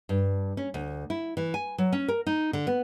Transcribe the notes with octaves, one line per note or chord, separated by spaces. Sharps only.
G2
C#4
D2
E4
E3
G#5
F#3
C#4
A#4
D#4
D3
B3